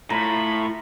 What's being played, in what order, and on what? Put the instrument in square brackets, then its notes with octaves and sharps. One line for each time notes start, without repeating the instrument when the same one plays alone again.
[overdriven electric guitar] A2 [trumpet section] F4 B5 [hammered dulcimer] A#5